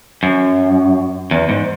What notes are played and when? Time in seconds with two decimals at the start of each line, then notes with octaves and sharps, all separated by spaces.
0.23 F#2
1.31 E2
1.49 G#2